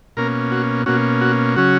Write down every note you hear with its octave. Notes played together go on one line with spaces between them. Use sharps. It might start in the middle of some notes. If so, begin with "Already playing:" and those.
B2 A#3 C#4 A#4
F#4
B2 A#3 C#4 F#4
F#4
C#3 F#3 C#4 F#4